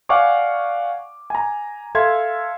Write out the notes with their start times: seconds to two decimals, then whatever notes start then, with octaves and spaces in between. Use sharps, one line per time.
0.09 D5 F5 F#5 G#5 C#6 D6
1.30 G#5 A#5
1.95 A4 E5 F5 C6 G#6